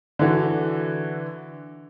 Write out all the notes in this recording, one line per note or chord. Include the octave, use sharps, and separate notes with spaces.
D3 E3 F#4